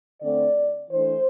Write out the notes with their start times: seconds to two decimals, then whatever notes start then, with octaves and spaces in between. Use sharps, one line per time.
0.22 D3 A3 C4 D5
0.91 E3 A3 D4 C5